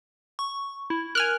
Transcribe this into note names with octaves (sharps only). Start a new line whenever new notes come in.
C#6
E4
A#4 G#5 F6 F#6